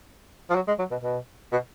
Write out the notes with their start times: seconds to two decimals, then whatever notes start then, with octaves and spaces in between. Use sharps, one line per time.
0.50 F3
0.55 F#3
0.67 G#3
0.79 F#3
0.91 B2
1.03 B2
1.52 B2